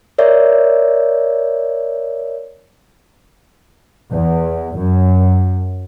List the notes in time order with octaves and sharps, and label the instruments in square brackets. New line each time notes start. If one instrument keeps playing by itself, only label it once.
[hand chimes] A#4 C#5 D5 E5
[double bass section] E2
F#2